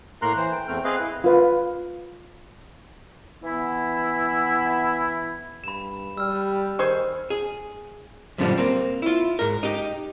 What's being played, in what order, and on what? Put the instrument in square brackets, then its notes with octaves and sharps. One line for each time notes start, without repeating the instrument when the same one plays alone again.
[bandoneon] A2 A#3 A#4 A#5 C6 F#6
E3 C5
G5
E2 A3 C4 G5 F6
C4 G#4 B4 D#5 F5
E4
[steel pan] F4 B4 F5
[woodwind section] E3 B3 E4
[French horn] G2 [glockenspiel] B5 E7
[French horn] G3 [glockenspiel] E6 F6
[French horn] D#3 [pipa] G#4 C5 C#6
[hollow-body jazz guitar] G#4
F#2 A#2 D3 D#3 F3 G3
A#3 C4
E4 F4
G#2 A#4
D#4 G4